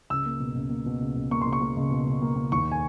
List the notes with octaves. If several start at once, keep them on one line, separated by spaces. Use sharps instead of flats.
C#2 E6
A#3
B2
C#2
A#3
B2
C#2
C#2
A#3 C#6
C#2 C6
C#6
A#3
C#2
B2
C#2
A#3
A#3
D#2 C#6
G#5